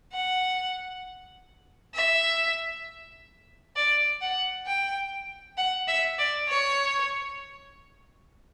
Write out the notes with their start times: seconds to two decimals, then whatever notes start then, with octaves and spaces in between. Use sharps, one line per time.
0.13 F#5
1.95 E5
3.76 D5
4.21 F#5
4.67 G5
5.57 F#5
5.88 E5
6.19 D5
6.48 C#5